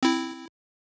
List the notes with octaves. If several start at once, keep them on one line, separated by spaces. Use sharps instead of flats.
C4 E4